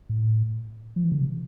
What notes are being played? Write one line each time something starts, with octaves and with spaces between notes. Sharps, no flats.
A2
F3
E3
D3
C3